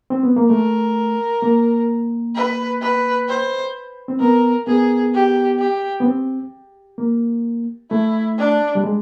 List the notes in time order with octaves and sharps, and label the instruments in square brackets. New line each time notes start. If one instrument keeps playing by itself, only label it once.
[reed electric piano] C4
B3
A#3
[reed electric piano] A3 [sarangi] A#4
[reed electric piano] A#3
[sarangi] B4
B4
C5
[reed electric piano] C4
[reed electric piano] B3 [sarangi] A#4
[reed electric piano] B3 [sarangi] G#4
[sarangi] G4
G4
[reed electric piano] B3
C4
A#3
[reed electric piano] A3 [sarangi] E4
[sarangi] D4
[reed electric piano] G3
G#3